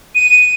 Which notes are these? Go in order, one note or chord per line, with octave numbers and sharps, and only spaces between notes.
D#7